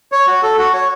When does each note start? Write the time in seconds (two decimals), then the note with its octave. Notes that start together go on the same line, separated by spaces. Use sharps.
0.12 C#5
0.27 F#4
0.43 A4
0.58 F#4
0.74 C#5